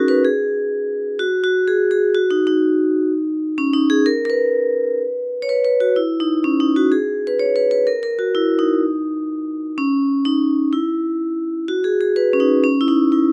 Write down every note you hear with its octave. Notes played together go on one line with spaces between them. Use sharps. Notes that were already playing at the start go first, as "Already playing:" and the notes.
Already playing: C#4 D#4 F#4 G#4 A#4
B4
G#4
F#4
F#4
G#4
G#4
F#4
D#4
D#4
C#4
D#4
G#4
A#4
A#4
B4
C#5
B4
B4
F#4
E4
D#4
C#4
D#4
F#4
G#4
B4
C#5
B4
B4
A#4
A#4
F#4
E4
D#4
C#4
D#4
E4
F#4
G#4
G#4
B4
C#4
D#4
C#4
E4
D#4
E4